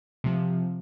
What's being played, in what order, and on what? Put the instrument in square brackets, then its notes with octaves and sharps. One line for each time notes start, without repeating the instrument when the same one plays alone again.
[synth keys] C3 F3